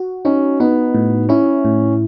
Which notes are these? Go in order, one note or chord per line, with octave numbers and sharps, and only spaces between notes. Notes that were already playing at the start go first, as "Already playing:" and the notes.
Already playing: F#4
C#4 D#4
B3 D#4
A2
C#4 E4
A2